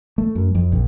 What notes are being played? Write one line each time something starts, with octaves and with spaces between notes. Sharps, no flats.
A3
F#2
F2
A#1